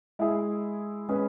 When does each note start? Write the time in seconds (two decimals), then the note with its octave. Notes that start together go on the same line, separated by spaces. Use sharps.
0.19 G#3 E4 G#4
1.09 G#3 C#4 G#4 B4